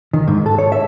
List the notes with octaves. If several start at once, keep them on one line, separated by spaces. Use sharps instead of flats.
D#3
G#2
A4
C#5
E5